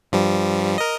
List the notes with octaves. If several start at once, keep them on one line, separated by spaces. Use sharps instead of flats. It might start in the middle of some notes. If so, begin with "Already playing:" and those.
G2 F3 G3
A#4 D#5